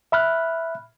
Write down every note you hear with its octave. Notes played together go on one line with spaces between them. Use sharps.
E5 B5 F6 F#6